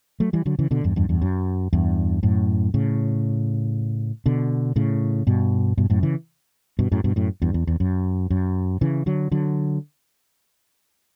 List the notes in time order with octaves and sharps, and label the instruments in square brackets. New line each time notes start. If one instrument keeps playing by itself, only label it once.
[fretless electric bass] F#3 A3
E3 G3
D3 F#3
C#3 E3
B2 D3
E2 G2
E2 G2
E2 G2
F#2
E2 G2
F#2 A2
A2 C#3
B2 D3
A2 C#3
G2 B2
G2 B2
F#2 A2
C#3 E3
G2 B2
F#2 A2
G2 B2
F#2 A2
E2 G2
E2
E2
F#2
F#2
C#3 E3
D3 F#3
D3 F#3